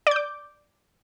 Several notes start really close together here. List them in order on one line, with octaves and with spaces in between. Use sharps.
D5 G6 D6